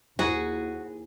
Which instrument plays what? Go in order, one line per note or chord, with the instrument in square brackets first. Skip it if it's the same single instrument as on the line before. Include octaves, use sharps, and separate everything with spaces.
[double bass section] D#2 [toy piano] E4 C5 [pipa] F#4 [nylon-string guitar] G#4